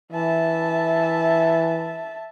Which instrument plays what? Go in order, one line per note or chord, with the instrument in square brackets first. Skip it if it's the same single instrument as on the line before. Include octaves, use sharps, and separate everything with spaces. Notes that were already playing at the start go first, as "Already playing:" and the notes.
[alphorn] E3 [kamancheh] E5 A5